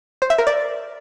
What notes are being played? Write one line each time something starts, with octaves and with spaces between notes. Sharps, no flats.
C5
E5
A#4
D5